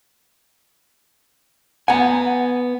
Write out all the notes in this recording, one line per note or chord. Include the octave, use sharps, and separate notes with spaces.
B3 F#5 G#5 A#5